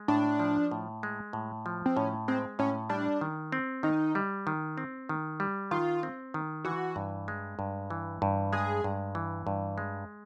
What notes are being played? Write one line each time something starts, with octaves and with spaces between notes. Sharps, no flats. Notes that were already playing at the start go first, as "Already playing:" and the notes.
Already playing: G#3
A2 D4
F3
A2
G#3
A2
F3
C4
A2 C#4
G#3 C4
A2 C#4
G3 D4
D#3
C4
D#3 D#4
G3
D#3
C4
D#3
G3
D#3 F4
C4
D#3
E3 F#4
G2
G#3
G2
E3
G2
G#3 G#4
G2
E3
G2
G#3